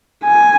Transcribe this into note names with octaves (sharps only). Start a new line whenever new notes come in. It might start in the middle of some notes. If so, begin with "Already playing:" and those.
G#5